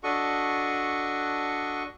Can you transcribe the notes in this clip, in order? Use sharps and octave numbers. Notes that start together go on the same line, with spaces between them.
D4 F#4 A4 D#5 C#6